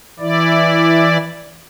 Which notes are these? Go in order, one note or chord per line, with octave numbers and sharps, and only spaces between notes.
E3 E4 D5